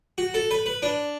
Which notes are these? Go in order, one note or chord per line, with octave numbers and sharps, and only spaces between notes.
F#4
A4
B4
B4
D4